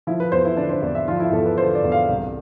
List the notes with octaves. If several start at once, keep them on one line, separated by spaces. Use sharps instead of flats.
F3 E4
B4
E2 C5
E4
D3 D4
C5
E2 D5
E5
F3 F4
E4
E2 A4
B4
D3 C5
D5
E2
F5
C2